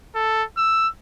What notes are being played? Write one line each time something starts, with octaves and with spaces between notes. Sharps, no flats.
A4
E6